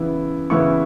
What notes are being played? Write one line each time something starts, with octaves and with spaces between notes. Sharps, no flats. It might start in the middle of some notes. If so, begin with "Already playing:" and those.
Already playing: C#3 E3 B3 E4
C#3 E3 B3 E4 C#6